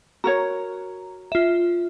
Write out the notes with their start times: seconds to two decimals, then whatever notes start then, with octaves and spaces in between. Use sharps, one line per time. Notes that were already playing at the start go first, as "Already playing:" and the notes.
0.24 F#4 A#4 C#5 A#5
1.32 F4 E5